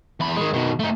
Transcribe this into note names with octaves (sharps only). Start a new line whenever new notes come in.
E2 B5
D#3 G#3
B2 D#3
A3 D#4